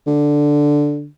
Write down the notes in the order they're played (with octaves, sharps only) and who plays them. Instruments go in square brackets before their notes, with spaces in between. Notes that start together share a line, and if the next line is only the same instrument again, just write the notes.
[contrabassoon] D3